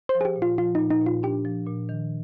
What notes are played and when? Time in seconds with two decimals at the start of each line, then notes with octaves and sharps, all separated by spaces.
0.09 C5
0.15 F3
0.21 G#4
0.25 G4
0.36 A#2
0.42 F4
0.58 F3 F4
0.75 A#2 D#4
0.90 D#4
1.01 A#2 F4
1.23 D4 G4
1.45 F3
1.66 A#2
1.89 D#3